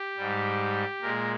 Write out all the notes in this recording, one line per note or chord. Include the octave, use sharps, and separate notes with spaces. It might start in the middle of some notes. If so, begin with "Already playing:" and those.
Already playing: G4
G#2 G3
A#2 G#3 A#4